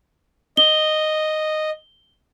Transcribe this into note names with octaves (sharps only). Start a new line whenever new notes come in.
D#5 G7